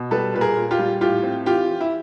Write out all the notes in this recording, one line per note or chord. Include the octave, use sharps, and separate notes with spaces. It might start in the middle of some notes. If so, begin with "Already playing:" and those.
Already playing: B2
G3 A4 B4
A#2 B4
G#4 A#4
A#2
F4 G4
G3
A2 F4 G4
C4
E3 F4 G4
E3
E4